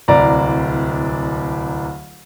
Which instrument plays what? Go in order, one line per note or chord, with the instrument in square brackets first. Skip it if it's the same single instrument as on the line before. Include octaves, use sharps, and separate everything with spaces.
[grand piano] D1 C2 D5 A#5